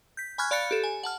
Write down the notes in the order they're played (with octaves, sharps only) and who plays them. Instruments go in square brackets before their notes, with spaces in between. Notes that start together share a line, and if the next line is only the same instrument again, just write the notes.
[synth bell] G6 B6
G#5 B5 C#6 F6 F#6 G#6
D5 F5 B5 F#6 A6 C#7
G4 A4
G#5
F#5 A5 F6